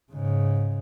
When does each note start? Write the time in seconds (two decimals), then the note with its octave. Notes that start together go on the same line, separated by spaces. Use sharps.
0.12 G#2 C#3